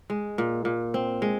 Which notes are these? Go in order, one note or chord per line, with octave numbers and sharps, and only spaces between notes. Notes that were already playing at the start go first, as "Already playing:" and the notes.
G#3
A#2
A#2
C4
G#3